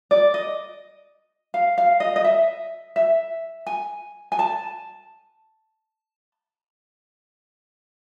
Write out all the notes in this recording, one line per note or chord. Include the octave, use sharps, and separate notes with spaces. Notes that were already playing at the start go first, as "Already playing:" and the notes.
D5
D#5
F5
F5
D#5
D#5
E5
E5
G#5
G#5
A5